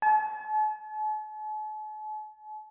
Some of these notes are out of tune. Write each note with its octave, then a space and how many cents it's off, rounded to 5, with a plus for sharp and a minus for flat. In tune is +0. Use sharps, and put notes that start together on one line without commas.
A5 -45